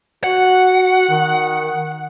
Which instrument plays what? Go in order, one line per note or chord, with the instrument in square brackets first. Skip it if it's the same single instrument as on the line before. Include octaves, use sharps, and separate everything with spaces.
[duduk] F#4 [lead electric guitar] F#5
[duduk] D#3